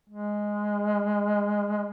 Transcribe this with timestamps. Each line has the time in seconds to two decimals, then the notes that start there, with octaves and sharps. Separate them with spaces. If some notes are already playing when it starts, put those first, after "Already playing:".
0.10 G#3